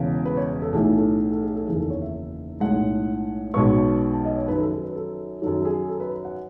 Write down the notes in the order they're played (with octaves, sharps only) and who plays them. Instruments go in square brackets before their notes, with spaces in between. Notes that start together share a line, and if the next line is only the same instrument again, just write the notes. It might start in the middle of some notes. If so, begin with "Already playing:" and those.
Already playing: [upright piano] E1 E2 C#3
B4
C#5
A4
B1 A2 E3 A3 G#4
A4
A4
A4
G#4
A4
F#1 E2 D#3 G#4
A4
C#5
E5
B1 A2 G#3 F#5
B1 B2 G#3 B3 C#6
A5
D#5
C#5
F#2 D#3 F#3 B4
A4
A4
B4
A4
F#2 D#3 F#3 A4
A4
G#4
A4
B4
F#5